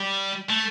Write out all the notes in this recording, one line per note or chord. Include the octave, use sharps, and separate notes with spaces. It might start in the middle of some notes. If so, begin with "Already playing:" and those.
Already playing: G3
A3